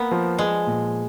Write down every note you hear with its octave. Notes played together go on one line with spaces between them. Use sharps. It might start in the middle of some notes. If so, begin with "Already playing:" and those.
Already playing: A#3 B3
F3
F3 G#3
A#2